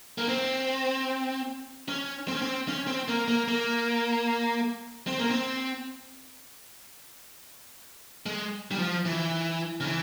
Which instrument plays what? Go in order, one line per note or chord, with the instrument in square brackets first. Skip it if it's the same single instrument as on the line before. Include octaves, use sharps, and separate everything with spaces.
[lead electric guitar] A#3
C4
C#4
C4
C#4
C4
C#4
C4
A#3
A#3
A#3
C4
A#3
C4
G#3
G3
F3
E3
C#3
E3